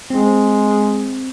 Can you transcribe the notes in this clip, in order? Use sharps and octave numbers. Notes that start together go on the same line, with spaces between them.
G#3 C4